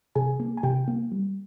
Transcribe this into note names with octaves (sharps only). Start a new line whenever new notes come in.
C3 G#4 G#5
A#3
G#5
C3 G4 G5
A#3
G3